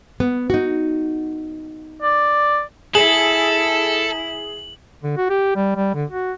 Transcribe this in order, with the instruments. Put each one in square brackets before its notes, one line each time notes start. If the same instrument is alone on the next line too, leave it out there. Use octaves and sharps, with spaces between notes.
[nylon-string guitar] B3
D#4 F#4
[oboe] D5
[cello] E4 [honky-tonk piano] G#4 [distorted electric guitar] A4 [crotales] F#7
[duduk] D3
F#4
G4
G3
G3
D3
F#4